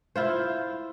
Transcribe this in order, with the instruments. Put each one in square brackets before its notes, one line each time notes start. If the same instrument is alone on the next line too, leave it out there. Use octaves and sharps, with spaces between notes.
[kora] E4 F4 C5